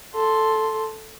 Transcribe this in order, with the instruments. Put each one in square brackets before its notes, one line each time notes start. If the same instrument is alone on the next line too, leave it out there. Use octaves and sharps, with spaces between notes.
[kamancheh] A4 C6